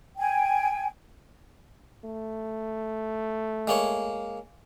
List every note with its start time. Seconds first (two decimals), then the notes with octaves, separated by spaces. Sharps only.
0.18 G5 G#5
2.05 A3
3.67 G#3 A#3 C#5